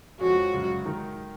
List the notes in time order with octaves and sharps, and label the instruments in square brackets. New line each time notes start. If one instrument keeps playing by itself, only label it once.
[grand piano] F2 F3 G#3 C#4 G#4 [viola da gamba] F#4
[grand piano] F#2 C#3 G#3
D#3 G#3 D#4 A#4